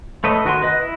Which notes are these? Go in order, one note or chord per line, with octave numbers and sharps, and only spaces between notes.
A3 A4 B4 C#5 D#5
D#3 F#4 A#4 G#5 C6
B4 D#5
E4